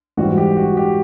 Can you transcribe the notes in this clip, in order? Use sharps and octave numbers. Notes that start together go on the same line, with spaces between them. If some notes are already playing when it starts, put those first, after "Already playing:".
G#2 E3 G3 F#4
G4
F#4
G4